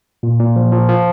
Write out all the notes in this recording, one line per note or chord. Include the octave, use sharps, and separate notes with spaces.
A#2
A#2
F3
F3
F3